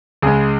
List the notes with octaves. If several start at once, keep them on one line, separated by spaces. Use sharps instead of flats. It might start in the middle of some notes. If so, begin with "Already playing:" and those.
C#2 C#3 G#3 G#4